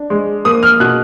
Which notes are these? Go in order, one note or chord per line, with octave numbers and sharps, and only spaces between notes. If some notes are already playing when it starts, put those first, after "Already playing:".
Already playing: D4
G#3
A#3 D#6
F6
B2 F#6